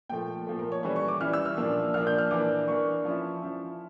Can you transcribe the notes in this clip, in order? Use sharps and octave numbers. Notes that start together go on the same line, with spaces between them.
A#2 F3 A3 G5
A#2 F3 A3
A#4
C#5
E3 G3 C#4 E4
C#6
D6
E3 G3 C#4 E4 F6
E6
F6
A#2 F3 A#3 D4
A#2 F3 A#3 D4 F6
G6
F6
E3 A#3 D4 D6
E3 A#3 D4 C#6
F3 C#4 E4
F3 C#4 E4